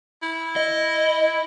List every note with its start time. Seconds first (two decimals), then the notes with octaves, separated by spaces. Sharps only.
0.22 E4
0.56 D#5